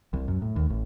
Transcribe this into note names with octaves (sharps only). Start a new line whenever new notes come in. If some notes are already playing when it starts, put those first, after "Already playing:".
C2
F#2
A2
D#2
A1